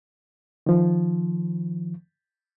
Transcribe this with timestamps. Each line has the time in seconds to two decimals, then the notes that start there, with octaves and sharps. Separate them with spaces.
0.66 D#3 F3